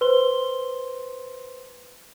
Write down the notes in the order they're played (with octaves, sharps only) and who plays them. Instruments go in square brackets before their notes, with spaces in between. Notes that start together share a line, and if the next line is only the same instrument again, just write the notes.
[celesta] B4 C5 C6 G7